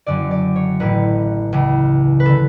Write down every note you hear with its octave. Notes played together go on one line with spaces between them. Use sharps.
F#1 F#2 D3 D5
D5
C#5
A1 A2 E3 B4
C#2 C#3 E3
B4
D3 A4